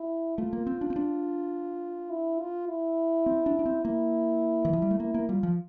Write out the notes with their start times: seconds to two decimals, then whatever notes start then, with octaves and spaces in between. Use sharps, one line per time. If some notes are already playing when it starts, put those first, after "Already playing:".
Already playing: E4
0.38 A3 F4
0.53 A#3
0.67 C4
0.81 D4
0.90 C4
0.96 D4
2.11 E4
2.40 F4
2.69 E4
3.26 C4
3.46 D4
3.59 D4
3.66 C4
3.84 A#3 E4
4.65 E3
4.73 F3
4.82 G3
4.91 A3
5.00 A#3 E4
5.14 A#3
5.28 G3 F4
5.43 F3